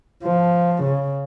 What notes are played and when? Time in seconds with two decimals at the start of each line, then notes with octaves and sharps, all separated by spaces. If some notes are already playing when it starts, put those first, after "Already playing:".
0.23 F3
0.83 C#3